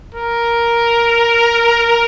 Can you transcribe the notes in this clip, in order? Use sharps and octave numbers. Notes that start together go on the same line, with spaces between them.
A#4